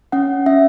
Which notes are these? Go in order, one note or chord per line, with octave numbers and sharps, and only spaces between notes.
C#4 F#5
C#4 E5